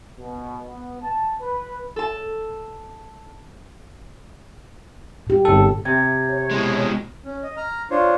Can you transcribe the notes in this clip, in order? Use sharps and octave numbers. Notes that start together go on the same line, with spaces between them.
B2
B3
A5
B4
A4 A5
A#2 G4
G1 A4
C3 G#6
C#5
B2 G#3
C#4
D#5
A#5 F6
D4 F4 C5 C#5